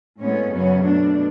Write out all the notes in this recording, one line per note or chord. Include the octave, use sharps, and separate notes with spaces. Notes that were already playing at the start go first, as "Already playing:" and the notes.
A2 G#3 B3 C#4
F#2 C#3 F#3 B3 C#4
B2 A3 D4